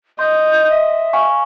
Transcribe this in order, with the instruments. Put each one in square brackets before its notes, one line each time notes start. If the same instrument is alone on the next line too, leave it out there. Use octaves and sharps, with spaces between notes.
[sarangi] D#5 [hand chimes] C6 [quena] G6
[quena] E5
[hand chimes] F5 G#5 C#6